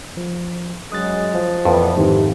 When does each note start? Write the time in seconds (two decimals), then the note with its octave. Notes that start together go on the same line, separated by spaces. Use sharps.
0.17 F3
0.92 F#2 F#3 G#3 D#6 F#6 A6
1.34 F3
1.65 F2 A#2 E3 B3
1.96 G#2 C3 D#3 E3